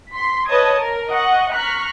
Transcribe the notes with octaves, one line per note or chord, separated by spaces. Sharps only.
C6 B6
B4 C#5 D#5 A5 D#6 G#6
A#4
D#5 F#5 C#6
A#5 C#6 F6 F#6 B6